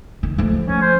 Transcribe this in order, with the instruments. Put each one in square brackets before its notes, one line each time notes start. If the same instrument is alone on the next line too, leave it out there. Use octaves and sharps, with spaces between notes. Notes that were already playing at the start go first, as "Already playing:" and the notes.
[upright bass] D#3
F3 A3
[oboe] C#4
C5